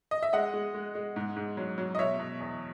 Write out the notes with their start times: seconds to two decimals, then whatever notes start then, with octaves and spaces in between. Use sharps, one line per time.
0.11 D#5
0.23 E5
0.33 G#3 D#5 F#5
0.54 G#3
0.75 G#3
0.95 G#3
1.16 G#2
1.37 G#2
1.57 F#3
1.78 F#3
1.95 D#5
1.99 B2 C#5 E5
2.19 B2
2.40 E2